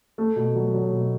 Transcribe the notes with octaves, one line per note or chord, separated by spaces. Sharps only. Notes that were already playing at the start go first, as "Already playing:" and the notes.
A3
B2
F#3
F#3
B2